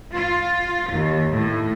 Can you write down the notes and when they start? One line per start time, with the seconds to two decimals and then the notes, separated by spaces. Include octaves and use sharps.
0.14 F4
0.92 D#2
1.33 A2